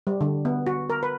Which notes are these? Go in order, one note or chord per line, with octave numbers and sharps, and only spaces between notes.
G3
D3
B3
F#4
A#4
B4